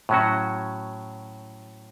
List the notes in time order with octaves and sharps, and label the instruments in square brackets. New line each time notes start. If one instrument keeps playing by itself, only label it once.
[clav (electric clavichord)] A2 F#3 C#4 F#4